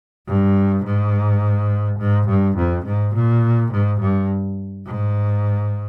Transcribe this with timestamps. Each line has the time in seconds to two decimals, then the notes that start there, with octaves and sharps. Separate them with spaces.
0.27 G2
0.85 G#2
1.99 G#2
2.28 G2
2.57 F2
2.85 G#2
3.15 A#2
3.71 G#2
4.00 G2
4.86 G#2